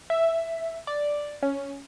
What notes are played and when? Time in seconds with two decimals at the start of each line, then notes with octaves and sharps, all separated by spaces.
0.10 E5
0.87 D5
1.43 C#4